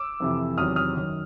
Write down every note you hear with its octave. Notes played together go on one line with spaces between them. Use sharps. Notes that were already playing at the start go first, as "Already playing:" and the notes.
Already playing: D6 E6
F2 C3 E3
E2 C3 D#3 F#3 D#6 F6
D#6 F6
F#2 D#3 F#3